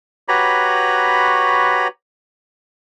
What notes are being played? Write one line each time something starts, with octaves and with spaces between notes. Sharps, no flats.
F#4 G4 B4 C#5 A#5 B5